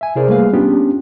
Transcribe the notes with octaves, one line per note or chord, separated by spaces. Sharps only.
E5 G#5
C3 E4 G#4 A#4 C5 D5
G3 A3 A#3 G#4 B4 F5
B3 C#4 D4 F4 G4